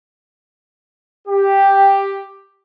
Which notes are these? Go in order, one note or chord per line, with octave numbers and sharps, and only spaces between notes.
G4